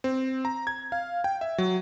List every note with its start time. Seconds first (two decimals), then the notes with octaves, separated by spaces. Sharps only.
0.04 C4
0.45 A#5
0.67 G#6
0.92 F5
1.24 G5
1.41 E5
1.58 F#3